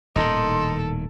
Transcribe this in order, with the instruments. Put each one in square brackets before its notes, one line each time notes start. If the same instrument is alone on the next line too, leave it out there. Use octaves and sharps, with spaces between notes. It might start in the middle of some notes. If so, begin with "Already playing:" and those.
[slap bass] D#1 A2 D#3 [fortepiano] D#4 [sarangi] A4 [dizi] C6